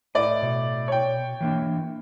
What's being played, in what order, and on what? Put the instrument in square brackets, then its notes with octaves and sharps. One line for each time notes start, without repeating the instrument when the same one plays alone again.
[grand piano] A2 D5 [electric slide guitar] D#5
[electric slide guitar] B2
[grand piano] C#5 G5
[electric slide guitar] E3 A#3 D4